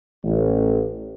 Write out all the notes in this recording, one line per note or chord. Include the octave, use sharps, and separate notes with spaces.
A1